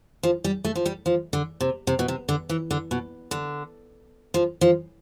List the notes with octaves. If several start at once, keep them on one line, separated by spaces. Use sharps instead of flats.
F3
G3
A3
F3
G3
F3
D3
C3
C3
B2
C3
D3
E3
D3
B2
D3
F3
F3